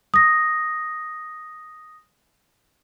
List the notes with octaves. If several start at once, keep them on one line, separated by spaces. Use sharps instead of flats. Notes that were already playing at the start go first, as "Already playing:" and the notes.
D#6 A#6